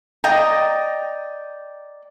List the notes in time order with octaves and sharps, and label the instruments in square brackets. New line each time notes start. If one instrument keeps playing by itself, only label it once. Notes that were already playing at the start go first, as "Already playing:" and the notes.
[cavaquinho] D5 D#5 G5 A#5